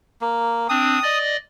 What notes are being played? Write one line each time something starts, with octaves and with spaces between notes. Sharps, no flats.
A#3
C4 D4 D#6
D5 D#5